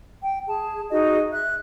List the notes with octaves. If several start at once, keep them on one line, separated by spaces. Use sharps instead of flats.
G5
G#4 A5
D#4 F#4 G#4 D#5
E5 F#6